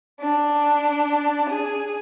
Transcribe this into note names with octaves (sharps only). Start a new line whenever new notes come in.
D4
G#4